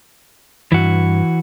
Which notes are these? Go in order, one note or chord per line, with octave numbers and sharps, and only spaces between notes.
G2 E3 F#4